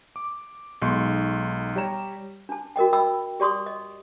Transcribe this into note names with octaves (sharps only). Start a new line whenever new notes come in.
D6
B1 G#3 D#4 C6 C#6
G3 G4 C#5 A#5 E7
D4 A5
F#4 A#4 D#5 G5
D#5 G5 B5 E6
G4 D5 C6 C#6 D#6
D#5